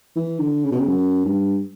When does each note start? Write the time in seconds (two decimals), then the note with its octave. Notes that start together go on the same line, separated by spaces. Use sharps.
0.16 E3
0.39 D3
0.64 C#3
0.71 B2
0.79 C#3
0.88 F#2
1.25 G2